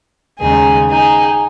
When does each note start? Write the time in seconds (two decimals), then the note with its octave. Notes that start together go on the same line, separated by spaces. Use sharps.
0.40 D#2 C#3 G#3 D#4 G#4
0.89 D#4 G#4